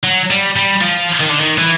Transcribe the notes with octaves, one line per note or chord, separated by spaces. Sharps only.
F#3
G3
G3
F3
D#3
D3
D#3
E3